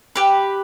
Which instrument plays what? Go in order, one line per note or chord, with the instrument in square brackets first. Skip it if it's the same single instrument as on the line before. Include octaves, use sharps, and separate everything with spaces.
[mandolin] G4 B4